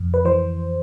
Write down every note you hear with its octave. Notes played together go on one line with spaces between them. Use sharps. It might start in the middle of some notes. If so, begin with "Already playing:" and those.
Already playing: F2 C3
B4
E3 C5